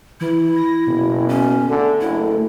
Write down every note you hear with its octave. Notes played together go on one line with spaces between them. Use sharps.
E3 E4
A#6
F#1 B2
C#4
D3 A3
F#1 E4